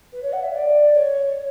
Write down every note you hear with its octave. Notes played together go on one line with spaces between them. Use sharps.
B4
C#5
F#5
E5
D5
C#5